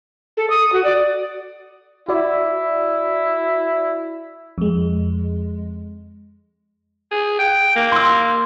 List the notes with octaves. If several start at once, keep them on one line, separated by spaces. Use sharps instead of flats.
A4
D#6
F#4
D5
E4 F#4 D5
F2 G#3
G#4
G5
A#3
C6 E6